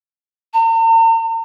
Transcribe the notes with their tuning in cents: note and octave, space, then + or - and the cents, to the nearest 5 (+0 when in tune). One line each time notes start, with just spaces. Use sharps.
A#5 -45